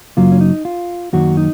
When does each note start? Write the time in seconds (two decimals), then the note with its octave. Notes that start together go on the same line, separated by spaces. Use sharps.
0.17 F#2 C#3 F#3 A#3 F4
0.32 C#4
0.41 D#4
0.65 F4
1.13 F#2 D#3 F#3 A#3 F#4
1.37 D#4